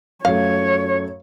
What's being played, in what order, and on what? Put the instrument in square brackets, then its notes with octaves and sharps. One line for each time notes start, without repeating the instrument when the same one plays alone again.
[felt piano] F#2 A3 [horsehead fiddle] C#5 [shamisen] F5